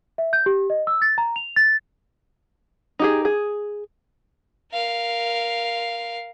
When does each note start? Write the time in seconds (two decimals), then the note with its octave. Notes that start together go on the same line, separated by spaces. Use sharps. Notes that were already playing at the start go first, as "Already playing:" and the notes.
0.18 E5
0.33 G6
0.46 G4
0.70 D#5
0.87 E6
1.02 A6
1.18 A#5
1.36 F7
1.56 A6
2.99 D#4 G4 G#4
3.25 G#4
4.73 A#4 F5